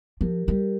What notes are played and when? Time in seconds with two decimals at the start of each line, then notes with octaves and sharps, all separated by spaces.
0.21 F3 G4 A#4
0.47 G3 G4 A#4